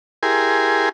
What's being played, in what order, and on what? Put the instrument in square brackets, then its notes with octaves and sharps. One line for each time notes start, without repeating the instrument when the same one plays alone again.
[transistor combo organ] E4 G4 G#4 A#4 G#5 C6